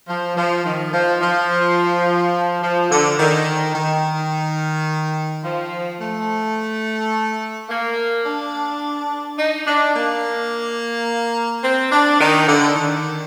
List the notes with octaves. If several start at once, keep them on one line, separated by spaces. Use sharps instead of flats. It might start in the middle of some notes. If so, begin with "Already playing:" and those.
F3
F3
D#3
F3
F3
F3
D3
D#3
D#3
F3
A3
A#3
D4
D#4
D4
A#3
C4
D4
D#3
D3
D#3